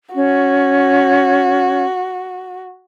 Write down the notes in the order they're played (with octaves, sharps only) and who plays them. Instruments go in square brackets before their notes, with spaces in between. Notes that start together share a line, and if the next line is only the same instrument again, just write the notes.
[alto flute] C#4 [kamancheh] F#4